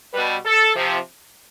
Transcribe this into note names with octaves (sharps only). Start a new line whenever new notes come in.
B2 G3 B4
A4
C3 F3